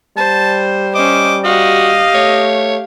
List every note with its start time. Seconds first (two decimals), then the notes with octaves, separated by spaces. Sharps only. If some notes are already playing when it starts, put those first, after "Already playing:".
0.17 G3 C5 A5
0.95 C#4 C5 D#5 D6
1.45 F#4 G4 D#5 F5
2.14 A3 C#5